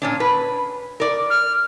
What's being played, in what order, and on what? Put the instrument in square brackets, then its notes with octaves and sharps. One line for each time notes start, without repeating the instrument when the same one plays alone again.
[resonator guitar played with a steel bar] A#2 C#4 D4
B4
A#4 D5
[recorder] F6